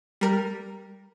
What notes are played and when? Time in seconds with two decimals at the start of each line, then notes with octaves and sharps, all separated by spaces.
0.21 G3 A#4